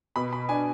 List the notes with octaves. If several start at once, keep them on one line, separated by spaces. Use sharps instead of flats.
B2 B5
B5
D4 G#5